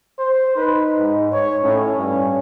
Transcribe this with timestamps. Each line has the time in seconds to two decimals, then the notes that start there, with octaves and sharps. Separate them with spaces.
0.19 C5
0.57 D#4 B4
0.98 G#2
1.32 C#5
1.63 A2 C#4
1.96 G2